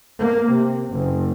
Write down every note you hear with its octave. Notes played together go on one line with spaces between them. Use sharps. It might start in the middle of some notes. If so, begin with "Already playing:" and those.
A#3
C3
F#1